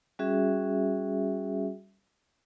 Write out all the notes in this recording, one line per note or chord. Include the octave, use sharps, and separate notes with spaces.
G3 C#4 F#4 G#4 E5